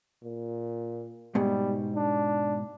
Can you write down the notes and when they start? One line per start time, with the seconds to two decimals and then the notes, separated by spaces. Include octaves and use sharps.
0.24 A#2
1.35 G#2 B2 G3
1.96 D4